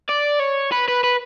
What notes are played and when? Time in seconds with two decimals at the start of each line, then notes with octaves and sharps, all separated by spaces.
0.09 D5
0.40 C#5
0.72 B4
0.88 B4
1.04 B4